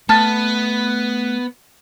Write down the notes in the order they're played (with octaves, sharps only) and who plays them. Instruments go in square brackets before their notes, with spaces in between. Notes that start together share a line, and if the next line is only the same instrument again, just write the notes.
[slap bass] A3 [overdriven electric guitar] B3 [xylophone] A5 F6 A6